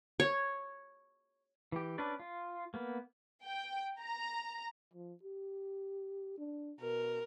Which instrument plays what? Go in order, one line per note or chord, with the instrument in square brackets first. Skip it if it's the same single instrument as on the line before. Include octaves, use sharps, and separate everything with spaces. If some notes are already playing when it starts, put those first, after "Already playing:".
[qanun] C#5
[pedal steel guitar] E3 G4
C#4 D4 B4 D5
F4
A#3 B3
[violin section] G5
A#5
[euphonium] F3
G4
D4
[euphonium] B2 [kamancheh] A#4